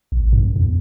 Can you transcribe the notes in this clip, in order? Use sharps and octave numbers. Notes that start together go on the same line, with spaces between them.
A1
F#2
E2